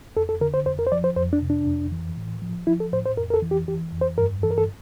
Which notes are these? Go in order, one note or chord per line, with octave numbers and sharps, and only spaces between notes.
F2 A4
A4
D3 A#4
C5
F2 C5
A#4
C5
F3 D5
C5
F2 C5
D4
C3
D4
F2
E3
A2
F3
F3 E4
A4
A2 C5
C5
F2 A#4
A#4
A4
E3
G4
E3 G4
F2
C5
G2 A#4
E3 A4
A#4
A4